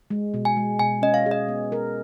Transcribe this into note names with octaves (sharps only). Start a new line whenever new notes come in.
G#3
B2
G#5
G#3
B2 G#5
C#4 D#5
F5
G#4
D#5
B3
A#4